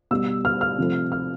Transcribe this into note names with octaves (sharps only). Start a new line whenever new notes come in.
B2 G3 E6
F6
F6
C3 F3 A3
F6